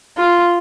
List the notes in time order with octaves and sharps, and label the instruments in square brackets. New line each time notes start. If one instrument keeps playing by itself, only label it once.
[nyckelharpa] F4